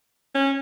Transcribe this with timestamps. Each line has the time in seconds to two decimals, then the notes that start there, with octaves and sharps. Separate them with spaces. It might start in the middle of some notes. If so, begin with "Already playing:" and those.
0.35 C#4